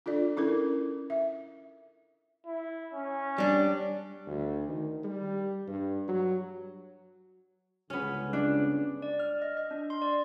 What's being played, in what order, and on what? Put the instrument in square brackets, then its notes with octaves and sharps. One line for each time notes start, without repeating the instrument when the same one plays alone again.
[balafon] D4 F4 A4 D5
C#4 E4 A4 A#4
E5
[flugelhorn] E4
C#4
[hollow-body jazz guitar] G3 D4
[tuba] D2
D#3
G3
G2
F#3
[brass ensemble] G1 C#2 C#3 [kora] B3 C#4
[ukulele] D4
[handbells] D5
F6
D#5
D#5
D4
C6
D5